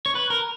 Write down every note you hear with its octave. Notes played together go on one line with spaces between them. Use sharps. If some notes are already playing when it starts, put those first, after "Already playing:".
C#5
B4
A#4